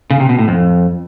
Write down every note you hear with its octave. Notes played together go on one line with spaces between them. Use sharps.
C#3
C3
B2
A2
F2